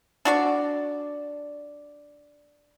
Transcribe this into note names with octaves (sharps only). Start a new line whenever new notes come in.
D4 F#4 D5